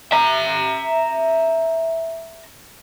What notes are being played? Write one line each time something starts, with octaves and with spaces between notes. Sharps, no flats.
E5 A#5